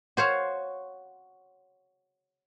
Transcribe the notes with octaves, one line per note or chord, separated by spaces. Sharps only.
F#4 C5 C#5 F5